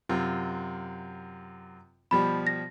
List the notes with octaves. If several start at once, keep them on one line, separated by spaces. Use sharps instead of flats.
F#2 C3 F4
B2 F3 G3 B5
A#6